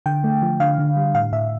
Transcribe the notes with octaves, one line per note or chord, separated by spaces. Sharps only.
D3 G5
A3
F3
D3 F5
D3
G3
A2 F5
A2 E5